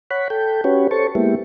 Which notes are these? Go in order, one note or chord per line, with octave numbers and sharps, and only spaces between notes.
C#5 F#5 B5
A4 G5
C#4 F#4 G4 B4 C#5
A4 C5 C#5 A5 C#6
G#3 A#3 B3 E4 G4